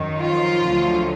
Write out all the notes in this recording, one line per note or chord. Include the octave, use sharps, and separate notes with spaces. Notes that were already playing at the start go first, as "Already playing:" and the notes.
Already playing: F#2 D#3 F#3
F3 F4
D2 D3 F#3